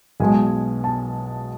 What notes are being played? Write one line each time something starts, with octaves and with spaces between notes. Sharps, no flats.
B1 B2 G#3 G#5
A5